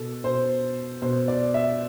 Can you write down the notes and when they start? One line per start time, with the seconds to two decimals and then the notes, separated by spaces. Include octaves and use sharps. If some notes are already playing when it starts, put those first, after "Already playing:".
Already playing: B2 A4
0.24 B2 C5
1.02 B2 C5
1.28 D5
1.54 E5